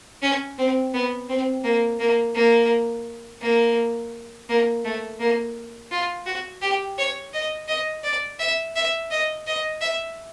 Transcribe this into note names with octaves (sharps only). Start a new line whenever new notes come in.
C#4
C4
B3
C4
A#3
A#3
A#3
A#3
A#3
A3
A#3
F4
F#4
G4
C#5
D#5
D#5
D5
E5
E5
D#5
D#5
E5